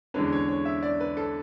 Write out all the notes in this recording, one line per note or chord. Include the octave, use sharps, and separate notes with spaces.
E2 D3 G#3 C#4 B4
C#5
C#5
E5
D5
B4
A4